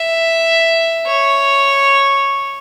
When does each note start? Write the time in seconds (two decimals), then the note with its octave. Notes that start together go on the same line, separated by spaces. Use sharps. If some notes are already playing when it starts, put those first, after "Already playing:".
Already playing: E5
1.07 C#5